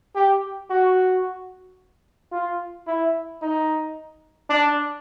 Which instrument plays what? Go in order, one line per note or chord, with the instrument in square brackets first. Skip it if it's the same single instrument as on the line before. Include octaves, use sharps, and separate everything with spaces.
[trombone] G4
F#4
F4
E4
D#4
D4